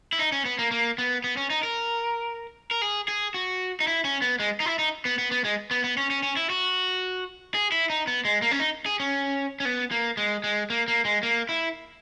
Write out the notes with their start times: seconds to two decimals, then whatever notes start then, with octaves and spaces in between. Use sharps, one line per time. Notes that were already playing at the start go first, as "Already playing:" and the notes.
0.13 E4
0.19 D#4
0.32 C#4
0.45 B3
0.59 A#3
0.71 A#3
0.98 B3
1.24 B3
1.37 C#4
1.50 D#4
1.63 A#4
2.71 A#4
2.82 G#4
3.08 G#4
3.34 F#4
3.80 D#4
3.87 E4
4.05 C#4
4.22 B3
4.40 G#3
4.60 D#4
4.66 E4
4.79 D#4
5.05 B3
5.19 B3
5.31 B3
5.45 G#3
5.71 B3
5.84 B3
5.97 C#4
6.10 C#4
6.23 C#4
6.37 E4
6.50 F#4
7.54 G#4
7.72 E4
7.90 D#4
8.07 B3
8.25 G#3
8.42 A#3
8.51 C#4
8.60 D#4
8.86 G#4
9.00 C#4
9.60 C#4
9.65 B3
9.91 A#3
10.17 G#3
10.44 G#3
10.70 A#3
10.88 A#3
11.05 G#3
11.23 A#3
11.49 E4